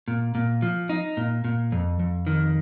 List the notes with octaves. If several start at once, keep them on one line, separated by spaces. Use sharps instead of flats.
A#2
A#2
F3
D#4
A#2
A#2
F2
F2
D#3